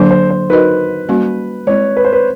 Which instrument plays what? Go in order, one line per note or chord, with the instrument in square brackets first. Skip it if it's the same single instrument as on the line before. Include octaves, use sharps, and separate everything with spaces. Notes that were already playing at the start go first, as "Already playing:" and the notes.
Already playing: [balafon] D3 F#3 A#3 D4 [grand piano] C5
[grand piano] C5
C5
[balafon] D#4 F#4 A#4 D#5 [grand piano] B4
[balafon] G3 A#3 C#4 F#4
[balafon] G#3 C4 E4 [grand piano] C#5
[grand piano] B4
C5
B4